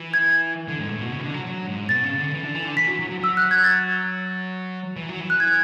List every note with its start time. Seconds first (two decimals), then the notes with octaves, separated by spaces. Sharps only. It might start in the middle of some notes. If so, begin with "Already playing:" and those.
Already playing: E3
0.14 G#6
0.68 D3
0.79 G#2
0.90 A2
1.01 B2
1.12 C#3
1.18 E3
1.24 D3
1.34 F#3
1.46 F#3
1.68 G#2
1.89 B2 A6
2.04 C#3
2.18 D3
2.33 E3
2.44 D3
2.55 E3
2.65 D3
2.77 E3 B6
2.87 F#3
2.99 F#3
3.10 F#3
3.20 F#3 E6
3.37 F#6
3.51 G#6
3.64 A6
4.97 E3
5.09 F#3
5.21 E3
5.30 F#6
5.40 G#6